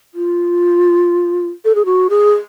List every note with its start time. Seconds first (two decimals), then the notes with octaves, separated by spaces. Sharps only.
0.14 F4
1.65 A4
1.75 G#4
1.85 F#4
2.10 G#4